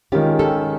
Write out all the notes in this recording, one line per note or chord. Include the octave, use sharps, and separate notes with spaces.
D#3 G#3 C#4 F4 G4
G4 A4